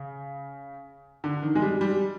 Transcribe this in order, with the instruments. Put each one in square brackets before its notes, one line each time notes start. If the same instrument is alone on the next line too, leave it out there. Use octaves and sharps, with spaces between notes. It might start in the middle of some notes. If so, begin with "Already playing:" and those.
Already playing: [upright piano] C#3
D3
D#3
G#3
G3
G3